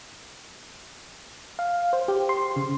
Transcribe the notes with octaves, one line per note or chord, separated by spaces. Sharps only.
F5
C5
G4
C6
C#3